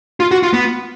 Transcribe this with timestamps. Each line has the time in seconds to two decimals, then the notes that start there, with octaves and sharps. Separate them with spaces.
0.20 F4
0.31 F#4
0.43 F4
0.53 B3